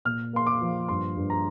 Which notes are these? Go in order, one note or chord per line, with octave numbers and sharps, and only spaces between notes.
A#2 F6
A#3 C6
D6
F3
G2 C6
G2
A#5